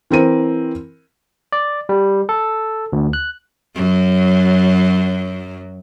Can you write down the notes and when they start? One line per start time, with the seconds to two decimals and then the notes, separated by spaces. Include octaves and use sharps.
0.11 E3 C4 A#4 D#7
1.52 D5
1.89 G3
2.29 A4
2.93 D2
3.13 F#6
3.76 F#2 F#3